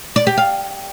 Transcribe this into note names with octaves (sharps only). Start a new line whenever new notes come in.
D5
G4
F5